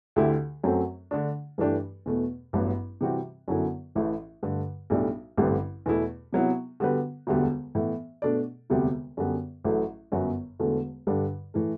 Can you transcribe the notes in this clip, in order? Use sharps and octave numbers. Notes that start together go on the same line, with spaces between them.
D2 D3 A3 E4 G4
F#2 F#3 A3 C4
D3 A3 D4
G2 E3 A3 D4 G4
E2 B2 A3
A1 G2 F#3 B3
C3 E3 G3 C4 F#4
F#2 D3 F#3 B3 E4
A1 A2 E3 A3
G2 D3 A3
B1 A2 G3 D4
A1 G2 D3 G3 C4
E2 B2 A3 E4
C3 F#3 B3 E4
D3 G3 B3 F#4 B4
E1 D2 D3 G3 B3
A2 E3 B3
B2 A3 D4 A4 D5
E1 D2 C3 G3 B3
F#2 D3 G3 B3
A1 A2 F#3 A3
G1 F#2 F#3 B3 F#4
E1 E2 D3 A3
G2 D3 G3 D4
A2 E3 A3